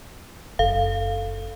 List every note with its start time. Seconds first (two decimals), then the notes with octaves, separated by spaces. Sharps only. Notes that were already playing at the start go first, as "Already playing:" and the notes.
0.59 F#1 A4 F5